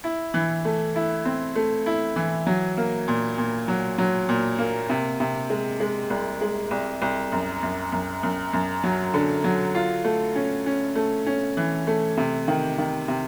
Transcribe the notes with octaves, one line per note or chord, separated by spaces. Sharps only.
E4
E3
A3
E4
C4
A3
E4
E3
F#3
A#3
A#2
A#2
F#3
F#3
A#2
A#3
C3
C3
G#3
G#3
C2
G#3
C2
C2
F#2
F#2
F#2
F#2
F#2
F#3
D3
F#3
F4
A3
C#4
C#4
A3
C#4
E3
A3
C3
D#3
D#3
C3